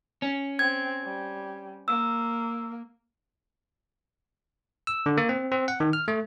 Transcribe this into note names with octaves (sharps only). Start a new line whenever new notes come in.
C#4
C4 G#6
G3
A#3 E6
E6
D3
A#3
C4
C4
F#5
D#3
F6
A3